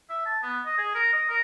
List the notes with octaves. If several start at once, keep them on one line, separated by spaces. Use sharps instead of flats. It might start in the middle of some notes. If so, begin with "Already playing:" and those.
E5
A5
B3
D#5
G#4
A#4
D#5
A#4